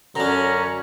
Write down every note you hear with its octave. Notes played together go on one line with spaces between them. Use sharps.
F#2 D3 C#4 D4 A#5